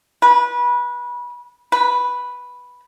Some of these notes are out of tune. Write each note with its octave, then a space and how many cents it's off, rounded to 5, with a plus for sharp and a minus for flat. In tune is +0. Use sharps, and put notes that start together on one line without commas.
B4 -25
B4 -5